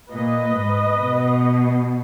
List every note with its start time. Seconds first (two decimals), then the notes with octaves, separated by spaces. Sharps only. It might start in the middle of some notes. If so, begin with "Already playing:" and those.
0.10 A#2 B4 D#5
0.53 G#2
0.96 B2